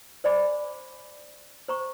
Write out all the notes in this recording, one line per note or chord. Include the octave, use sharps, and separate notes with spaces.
C5 D5 G#5 B5 D6
C5 A#5 C#6